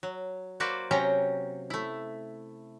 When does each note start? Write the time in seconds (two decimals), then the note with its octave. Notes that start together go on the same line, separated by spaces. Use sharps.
0.03 F#3
0.60 A#3 F#4 B4 C5 D5
0.91 C3 F#3 C#4 G5 A#5
1.70 A3 E4